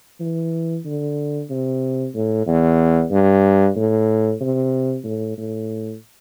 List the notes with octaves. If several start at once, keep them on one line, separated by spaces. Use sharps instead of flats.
E3
D3
C3
A2
E2
G2
A2
C3
A2
A2